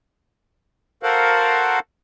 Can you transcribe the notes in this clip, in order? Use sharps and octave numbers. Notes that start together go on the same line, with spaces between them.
F#4 A4 A#4 C5 F5 F#5